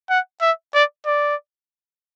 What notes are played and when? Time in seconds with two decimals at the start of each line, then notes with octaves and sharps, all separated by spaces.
0.10 F#5
0.41 E5
0.74 D5
1.06 D5